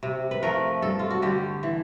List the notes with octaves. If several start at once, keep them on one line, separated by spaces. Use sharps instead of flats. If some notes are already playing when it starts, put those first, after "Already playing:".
C3
B4
F3 A3 A#4
G2 A4
F4
F#4
D3 G3 G4
E3